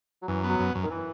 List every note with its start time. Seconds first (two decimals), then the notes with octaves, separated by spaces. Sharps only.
0.22 F#3
0.28 F#2 E3
0.44 B3
0.49 F#3
0.60 F#2
0.75 F#2
0.83 D#3
0.90 E3